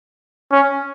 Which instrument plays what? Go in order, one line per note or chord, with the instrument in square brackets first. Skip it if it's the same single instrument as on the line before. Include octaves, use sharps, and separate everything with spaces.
[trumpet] C#4